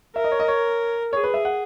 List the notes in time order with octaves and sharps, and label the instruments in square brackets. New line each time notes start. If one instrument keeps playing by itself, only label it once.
[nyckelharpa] A#4 [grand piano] E5
[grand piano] D#5
C#5
D#5
C#5
[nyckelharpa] G#4 [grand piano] C#5
[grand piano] B4
E5
F#5